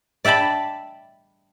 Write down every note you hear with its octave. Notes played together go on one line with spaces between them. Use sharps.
D5 E5 G5 A5 B5